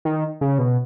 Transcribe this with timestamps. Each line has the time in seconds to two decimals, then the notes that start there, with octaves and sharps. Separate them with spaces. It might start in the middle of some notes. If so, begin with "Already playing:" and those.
0.05 D#3
0.41 C#3
0.58 B2